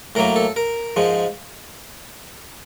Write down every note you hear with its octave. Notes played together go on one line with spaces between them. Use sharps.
A2 F#3 A#3 A#4
A4
A#4
G#2 F3 G#3